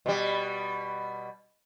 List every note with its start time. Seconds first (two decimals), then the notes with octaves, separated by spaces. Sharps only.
0.06 B2 G3